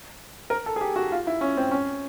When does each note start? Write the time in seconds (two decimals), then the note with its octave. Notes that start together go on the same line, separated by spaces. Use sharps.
0.50 A#4
0.66 A4
0.76 G#4
0.81 G4
0.96 F#4
1.12 F4
1.27 E4
1.41 C#4
1.57 C4
1.71 C#4